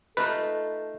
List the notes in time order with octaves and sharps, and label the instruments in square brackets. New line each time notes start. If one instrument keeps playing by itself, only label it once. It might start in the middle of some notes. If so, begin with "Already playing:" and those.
[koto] A3 D#4 F4 [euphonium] A4 [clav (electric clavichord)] B4